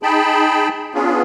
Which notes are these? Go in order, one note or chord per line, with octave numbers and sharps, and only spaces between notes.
D#4 G#4 G5 A5 B5
B3 C#4 D4 F4 G#4